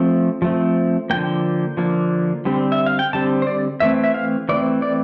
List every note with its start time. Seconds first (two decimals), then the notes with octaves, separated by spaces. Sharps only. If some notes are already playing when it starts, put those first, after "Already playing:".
Already playing: F3 A3 C4
0.42 F3 A3 C4
1.10 D3 F3 A#3 G5
1.77 D3 F3 A#3
2.45 D3 G3 C4
2.72 E5
2.86 F5
2.99 G5
3.13 D3 G3 C4 A5
3.42 C5
3.47 D5
3.80 E3 A3 C4 E5
4.04 E5
4.14 F5
4.49 E3 A3 C4 D5
4.82 D5